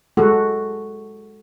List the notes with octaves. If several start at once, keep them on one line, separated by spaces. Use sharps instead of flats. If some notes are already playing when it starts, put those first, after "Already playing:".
G#3 F#4 A4